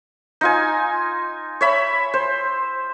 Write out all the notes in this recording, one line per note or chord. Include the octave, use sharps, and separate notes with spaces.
D#4 F4 G#5
C#5 E5 B5
C5